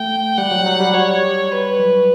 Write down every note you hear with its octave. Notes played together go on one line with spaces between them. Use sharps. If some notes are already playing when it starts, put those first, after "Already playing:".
Already playing: A3 G5
G3 F#5
F#3
F#3
G3
C#5
G3
B4
F#3